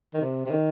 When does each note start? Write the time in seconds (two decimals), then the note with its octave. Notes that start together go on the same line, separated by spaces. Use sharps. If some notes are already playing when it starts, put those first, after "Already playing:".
0.14 D#3
0.21 C3
0.46 C3
0.51 D#3